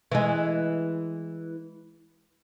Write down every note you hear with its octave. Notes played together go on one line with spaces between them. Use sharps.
E3 G#3